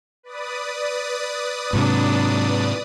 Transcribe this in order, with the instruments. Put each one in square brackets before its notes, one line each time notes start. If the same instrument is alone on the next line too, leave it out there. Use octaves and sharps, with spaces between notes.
[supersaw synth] B4 D5 D#6
[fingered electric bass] G#2 C3 [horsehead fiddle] F#3 D4